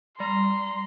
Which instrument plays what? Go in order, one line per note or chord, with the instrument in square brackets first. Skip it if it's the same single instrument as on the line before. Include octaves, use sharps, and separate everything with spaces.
[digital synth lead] G3 [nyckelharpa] A#5 [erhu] C6